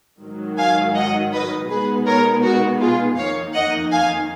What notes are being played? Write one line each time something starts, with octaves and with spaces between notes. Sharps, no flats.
G#2 D#3 F#3
F5 G#5
D#5 F#5
B4 D#5
B2 G#3 B3 D#4 G#4 B4
A#4 C#5
F#4 A#4
F4 G#4
F2 D#3 A#3 D#4 C#5 F5
D#5 F#5
F5 G#5